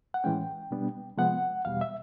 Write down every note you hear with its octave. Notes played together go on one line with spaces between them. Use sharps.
F#5
A2 E3 G#3 C#4 G5
B2 G3 B3 D4
C3 F3 G#3 B3 F#5
E2 B2 G3 F5
E5